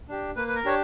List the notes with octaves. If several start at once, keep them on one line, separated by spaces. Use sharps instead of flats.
D4 G4
A#3 B4
B4
A#4
D4 G4 C#5